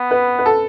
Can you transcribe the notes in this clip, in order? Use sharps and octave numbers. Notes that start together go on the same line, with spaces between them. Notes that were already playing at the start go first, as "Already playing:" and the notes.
Already playing: B3
B4
B4
A4